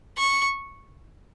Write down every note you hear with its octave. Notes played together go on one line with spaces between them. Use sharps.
C#6